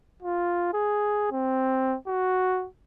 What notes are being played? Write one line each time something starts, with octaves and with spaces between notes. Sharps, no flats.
F4
G#4
C4
F#4